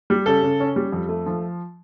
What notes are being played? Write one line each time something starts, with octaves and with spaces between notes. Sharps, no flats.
G3
C#3 A4
C#3
C#4
G3
F2
A3
F3